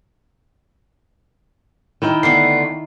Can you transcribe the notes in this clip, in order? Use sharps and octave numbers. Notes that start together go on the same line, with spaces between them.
D#3 E4 G5
D3 A3 B3 C7